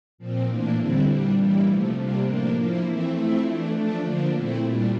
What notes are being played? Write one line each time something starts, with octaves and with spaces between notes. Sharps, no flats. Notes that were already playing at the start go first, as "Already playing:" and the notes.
A#2 F3 C4
A2 E3 A#3 D4
D3 G3 C4 E4
A#2 G3 D4
E3 G3 A#3 E4
C3 F3 A3
C3 G3 A#3 D4
A2 F3 A#3 D4
F3 A#3 E4
E3 A3 C4 E4
F3 A3 C4 E4
E3 A3 D4
F3 A3 D4
D3 F3 A#3 D4
A#2 A3 C4 E4
A#2 G3 D4